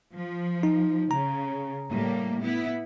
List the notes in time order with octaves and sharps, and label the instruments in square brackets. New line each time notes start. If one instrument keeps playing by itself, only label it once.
[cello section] F3
[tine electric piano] D#4
[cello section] C#3 [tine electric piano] A#5
[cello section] A2 G3 A#3
B3 E4